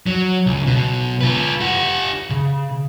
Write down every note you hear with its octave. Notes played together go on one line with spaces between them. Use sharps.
F#3
C#2
B1 B2
F4 B4
G4 F#5
C#3